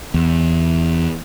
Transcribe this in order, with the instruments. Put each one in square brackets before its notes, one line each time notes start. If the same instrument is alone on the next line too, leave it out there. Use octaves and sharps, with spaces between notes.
[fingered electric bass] E2